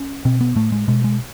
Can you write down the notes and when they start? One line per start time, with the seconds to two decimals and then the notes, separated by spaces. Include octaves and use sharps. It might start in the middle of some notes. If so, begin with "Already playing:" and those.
Already playing: C#4
0.25 B2 C4
0.41 B3
0.56 A2 A3
0.72 G#3
0.88 B2 G#3
1.04 G#3